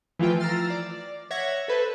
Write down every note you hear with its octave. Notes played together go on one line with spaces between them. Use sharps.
E3 F3 A3 F4 G5
A#5 E6 F6 A6 C7
D5
C#5 E5 F#5 G#6 A#6
A4 B4 C5